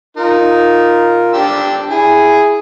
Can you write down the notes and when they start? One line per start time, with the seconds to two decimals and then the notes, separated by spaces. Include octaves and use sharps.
0.17 D#4 F4 A#4
1.34 D4 G4 E6
1.90 E4 G#4